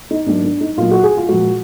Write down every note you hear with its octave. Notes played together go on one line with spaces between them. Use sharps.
D#4
G#2 F#3 A#3 D4
D4
D#4
A#2 F#3 A#3 F4
F#4
G#4
F4
A#2 F3 G#3 F#4